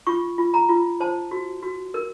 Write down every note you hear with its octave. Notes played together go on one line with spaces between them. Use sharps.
F4 C#6
F4
A#5
F4
C5 A5
F#4
F#4
A#4